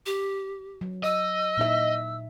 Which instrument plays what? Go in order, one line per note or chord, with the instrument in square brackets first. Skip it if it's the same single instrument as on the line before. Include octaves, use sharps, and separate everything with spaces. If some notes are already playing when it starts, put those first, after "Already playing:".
[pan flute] G4
[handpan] F#3
[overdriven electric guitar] D#5 [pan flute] E6
[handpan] A#2 D#4 E5